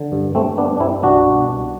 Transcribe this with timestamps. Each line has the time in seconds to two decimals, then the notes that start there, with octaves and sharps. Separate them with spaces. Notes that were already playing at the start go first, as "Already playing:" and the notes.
Already playing: D3
0.12 G2
0.35 G2 A3 C4
0.58 G2 B3 D4
0.77 D4
0.80 G2 C4 E4
1.03 C2 D4 F#4
1.26 B2
1.48 C2